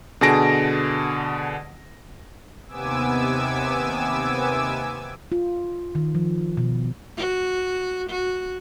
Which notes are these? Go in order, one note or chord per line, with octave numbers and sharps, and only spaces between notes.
B2 D3 G#4 A5 A#6 D7
D#2 C3 B3 G#5 D6 E6
F4
D#3
F3
B2
F#4
F#4